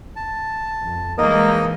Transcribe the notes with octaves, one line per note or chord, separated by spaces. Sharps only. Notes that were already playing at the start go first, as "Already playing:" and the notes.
A5
F2
E3 G#3 A#3 D#4 D#5 D#6